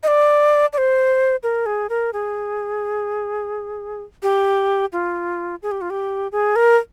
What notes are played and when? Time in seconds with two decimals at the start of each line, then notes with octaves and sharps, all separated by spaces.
0.03 D#5
0.08 D5
0.73 D5
0.78 C5
1.43 A#4
1.66 G#4
1.90 A#4
2.13 G#4
4.23 G4
4.93 F4
5.63 G#4
5.71 G4
5.81 F4
5.90 G4
6.32 G#4
6.56 A#4